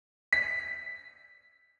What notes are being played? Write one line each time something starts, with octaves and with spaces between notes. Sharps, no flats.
B6